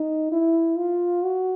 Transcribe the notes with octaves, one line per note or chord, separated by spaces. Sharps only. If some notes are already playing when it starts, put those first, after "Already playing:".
Already playing: D#4
E4
F4
F#4